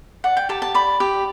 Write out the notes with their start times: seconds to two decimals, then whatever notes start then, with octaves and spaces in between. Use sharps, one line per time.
0.24 D5 F#5
0.37 G5
0.49 G4 A5
0.62 A5
0.74 D5 B5
1.00 G4